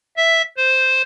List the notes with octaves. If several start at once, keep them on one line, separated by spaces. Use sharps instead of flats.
E5
C5